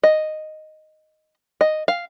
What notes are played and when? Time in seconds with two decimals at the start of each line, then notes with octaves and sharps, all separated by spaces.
0.03 D#5
1.61 D#5
1.88 F5